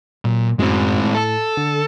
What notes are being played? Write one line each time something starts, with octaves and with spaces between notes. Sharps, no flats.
A#2 F#3
F#2 A2 G#3 C4 F#4
A2
A4
D3